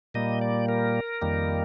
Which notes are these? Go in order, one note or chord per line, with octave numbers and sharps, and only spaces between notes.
A#2 G3 A#3 D#5
D5
A#4
F2 D#3 G3 A#3